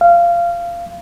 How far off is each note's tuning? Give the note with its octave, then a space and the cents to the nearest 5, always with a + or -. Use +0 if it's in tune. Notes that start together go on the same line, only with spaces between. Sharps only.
F5 -20